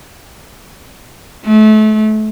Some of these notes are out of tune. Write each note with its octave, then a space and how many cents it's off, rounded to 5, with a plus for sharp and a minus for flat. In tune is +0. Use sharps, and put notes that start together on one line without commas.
A3 -30